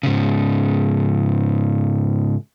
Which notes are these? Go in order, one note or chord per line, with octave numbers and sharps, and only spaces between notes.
G#2 C#3